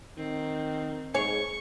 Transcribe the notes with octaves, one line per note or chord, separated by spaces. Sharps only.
D#3 C4
G#2 G#4 C#5 C#6